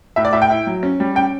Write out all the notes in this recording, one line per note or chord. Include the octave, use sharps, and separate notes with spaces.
A2 E5
D5
A2 E5
G5
E4
F#3
C#4
G3
C#4 G5